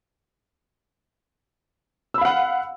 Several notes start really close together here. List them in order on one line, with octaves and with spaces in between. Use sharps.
E6 B5 F5 F#5